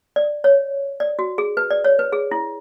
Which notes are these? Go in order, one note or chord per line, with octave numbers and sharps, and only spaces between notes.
D5
C#5
D5
F#4
G#4
B4
D5
C#5
B4
G#4
E4